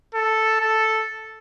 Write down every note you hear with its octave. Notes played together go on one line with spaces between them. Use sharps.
A4
A4